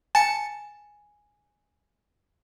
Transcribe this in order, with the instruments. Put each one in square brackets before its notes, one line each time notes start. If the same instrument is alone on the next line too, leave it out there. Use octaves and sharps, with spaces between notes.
[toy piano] G#5 [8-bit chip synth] A5 C#7